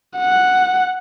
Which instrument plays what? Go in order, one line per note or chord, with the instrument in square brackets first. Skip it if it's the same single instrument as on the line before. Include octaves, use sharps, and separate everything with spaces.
[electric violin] F#5